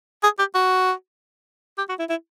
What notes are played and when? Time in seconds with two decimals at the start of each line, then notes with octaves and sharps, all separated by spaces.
0.23 G#4
0.39 G4
0.54 F#4
1.78 G4
1.89 F#4
1.99 E4
2.10 E4